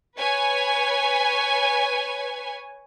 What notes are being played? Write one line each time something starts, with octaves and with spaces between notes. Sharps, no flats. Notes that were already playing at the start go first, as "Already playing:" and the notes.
B4 C#5 G#5